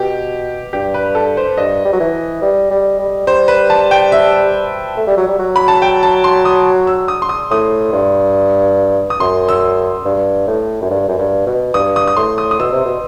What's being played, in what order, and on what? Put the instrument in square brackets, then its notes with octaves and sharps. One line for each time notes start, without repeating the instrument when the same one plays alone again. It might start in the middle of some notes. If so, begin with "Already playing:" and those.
Already playing: [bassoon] B2 [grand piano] G4
[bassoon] G2 [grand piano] G4
[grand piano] B4
A4
C5
[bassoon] G2 [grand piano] D#5
[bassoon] G3
F#3
E3
G3
G3
G3
[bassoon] G3 [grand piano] C5
[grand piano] B4
A5
G5
E5
[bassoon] A3
G3
F#3
G3
F#3
[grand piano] B5
A5
G5
A5
C6
D#6
E6
D#6
C6
D#6
[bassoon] A2 [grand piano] D#6
[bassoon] G2
[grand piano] D#6
[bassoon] F#2 [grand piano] C6
[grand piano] E6
[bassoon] G2
A2
F#2
G2
F#2
G2
B2
[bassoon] G2 [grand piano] D#6
[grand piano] D#6
D#6
[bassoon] A2 [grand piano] C6
[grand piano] D#6
D#6
[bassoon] B2 [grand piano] E6
[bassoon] C3
B2